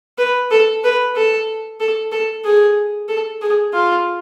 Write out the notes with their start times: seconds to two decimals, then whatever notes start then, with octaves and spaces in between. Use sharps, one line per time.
0.18 B4
0.51 A4
0.84 B4
1.16 A4
1.80 A4
2.12 A4
2.44 G#4
3.09 A4
3.42 G#4
3.73 F4